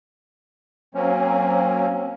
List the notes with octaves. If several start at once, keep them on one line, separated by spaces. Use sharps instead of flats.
F#3 A#3 C4 C#4